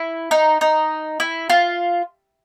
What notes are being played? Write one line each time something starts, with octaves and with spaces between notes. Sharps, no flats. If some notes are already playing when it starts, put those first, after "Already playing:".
Already playing: E4
D#4
D#4
E4
F4